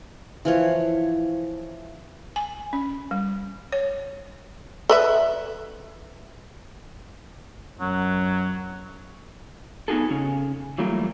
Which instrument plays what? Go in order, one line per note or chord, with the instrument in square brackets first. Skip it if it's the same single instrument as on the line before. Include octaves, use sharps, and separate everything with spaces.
[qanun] E3 F3 C#5
[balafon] G#5
C#4
G3
C#5
[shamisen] A4 B4 E5
[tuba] F#2 [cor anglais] F#3
[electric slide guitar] B3 D#4 F#4 G#4 A4
C#3 C#4
E3 F#3 G3 A3 A#3 F4